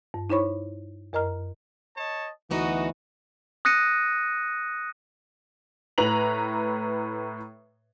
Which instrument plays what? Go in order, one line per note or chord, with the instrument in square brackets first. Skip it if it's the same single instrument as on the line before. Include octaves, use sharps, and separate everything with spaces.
[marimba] G2
D#4 E4 C5 C#5 B5 C#6
F#2 A#4 D#5 A#5 F6
[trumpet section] C#5 D#5 A5
[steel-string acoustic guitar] D2 B3 D#4 [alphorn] E3 [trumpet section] F#4
[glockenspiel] D#6 F#6 A#6 C#7 D#7
[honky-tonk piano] A2 B4 A#5 B5 F7 F#7